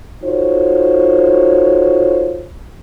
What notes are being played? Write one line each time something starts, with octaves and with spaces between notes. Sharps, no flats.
D#4 F4 F#4 A4 C5 C#5